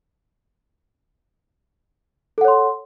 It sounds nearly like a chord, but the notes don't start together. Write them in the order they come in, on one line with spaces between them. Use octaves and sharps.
A4 F#5 C#5 C6